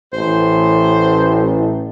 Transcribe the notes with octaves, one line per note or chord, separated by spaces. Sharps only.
A1 C5